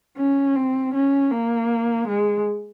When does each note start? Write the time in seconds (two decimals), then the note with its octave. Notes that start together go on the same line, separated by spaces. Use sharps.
0.17 C#4
0.56 C4
0.94 C#4
1.31 A#3
2.08 G#3